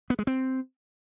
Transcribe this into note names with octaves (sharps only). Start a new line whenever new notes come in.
B3
G#3
C4